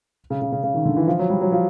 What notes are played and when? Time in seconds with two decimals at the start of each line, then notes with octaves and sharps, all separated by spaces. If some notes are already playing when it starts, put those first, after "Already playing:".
0.30 C#3
0.42 C#3
0.52 C#3
0.63 C#3
0.74 D#3
0.86 D3
0.97 E3
1.08 F3
1.19 F#3
1.30 G3
1.41 F#3
1.52 F3